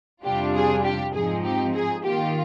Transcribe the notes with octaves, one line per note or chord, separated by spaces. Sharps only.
F2 C3 G3 D4 F4 G4
G#4
G4
G#2 F3 C4 D#4 G#4
G4
G#4
D#3 A#3 F4 G4